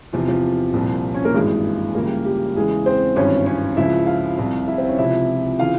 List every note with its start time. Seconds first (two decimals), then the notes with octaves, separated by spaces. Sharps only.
0.13 E2 C3 F3 F4
0.28 F3 F4
0.73 C2 A#2 F3
1.15 C#4 C#5
1.25 A#3 A#4
1.34 G#1 G2 E3 G#3 G#4
1.95 C#2 C#3 E3 A#3 A#4
2.05 G3 G4
2.25 G3 G4
2.56 E2 C#3 E3 G#3 G#4
2.86 C4 C5
3.16 G#1 G2 E3 C#4 C#5
3.46 C#4 C#5
3.77 C#2 C#3 F3 E4 E5
4.07 F4 F5
4.38 C2 C3 F3
4.68 E4 E5
4.78 C4 C5
4.89 C#4 C#5
4.98 C#2 C3 F3 E4 E5
5.59 C#3 E3 F4 F5